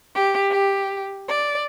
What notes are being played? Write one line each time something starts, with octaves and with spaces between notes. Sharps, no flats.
G4
G4
D5